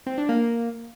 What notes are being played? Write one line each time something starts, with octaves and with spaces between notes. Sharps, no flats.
C4
D4
A#3